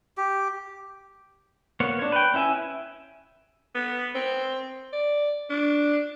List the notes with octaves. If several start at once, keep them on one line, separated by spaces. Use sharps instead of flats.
G4
A#3 B3 C#5
D4 C#5
B4 G5
C#4 E4 E5 G#5
B3
C4
D5
D4